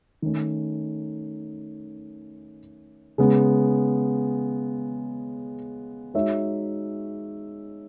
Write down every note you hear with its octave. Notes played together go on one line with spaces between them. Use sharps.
D#3 A3 C#4
C#3 G#3 B3
G#3 D#4 F#4 C#5 E5